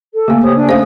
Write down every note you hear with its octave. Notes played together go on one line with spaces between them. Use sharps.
A4
C#3 A3 A#3 F5
G4 C5 C#5 D#6
D4 G#5
A3 C#4 C5 F5 D#6